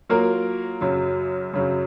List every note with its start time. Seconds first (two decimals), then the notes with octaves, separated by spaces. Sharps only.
0.09 F#3 A#3 F4 A#4
0.81 F#2 C#3 F#3
1.54 F#2 C#3 F#3